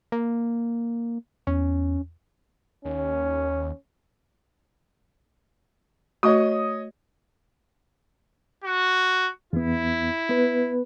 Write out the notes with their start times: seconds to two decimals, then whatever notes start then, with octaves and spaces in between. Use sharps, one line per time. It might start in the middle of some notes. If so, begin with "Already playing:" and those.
0.12 A#3
1.47 E2 C#4
2.85 D#2 C#4
6.23 A3 F#4 C#5 D#5 D#6
8.64 F#4
9.53 E2 B3 E4
10.29 B3 B4